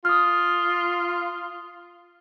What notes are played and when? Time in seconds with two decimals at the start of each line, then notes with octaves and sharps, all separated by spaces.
0.05 F4 D#6 F6